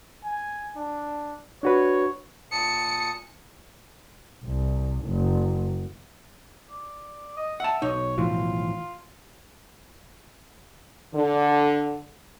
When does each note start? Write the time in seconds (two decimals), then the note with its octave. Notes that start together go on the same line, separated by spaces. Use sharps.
0.24 G#5
0.76 D4
1.63 D4 F#4 B4 C#5
2.52 A#2 A5 D#6 C#7
4.44 C2
5.06 F#1
6.70 D5
7.37 D#5
7.60 E5 F#5 A5
7.82 B1 D#4 C#5
8.18 A2 E3 F3 F4
11.14 D3